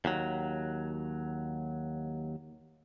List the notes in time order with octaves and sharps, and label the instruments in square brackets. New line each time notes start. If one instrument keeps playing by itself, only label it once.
[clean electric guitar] D#2 F#3